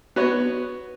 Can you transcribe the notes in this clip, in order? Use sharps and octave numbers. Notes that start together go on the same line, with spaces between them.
B3 F#4 B4 C#5